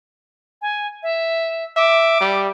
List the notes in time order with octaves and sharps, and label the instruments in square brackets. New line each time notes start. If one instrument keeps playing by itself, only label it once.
[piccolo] G#5
E5
[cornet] E5 [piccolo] D6
[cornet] G3